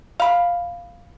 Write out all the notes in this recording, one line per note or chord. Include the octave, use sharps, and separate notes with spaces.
F5 B5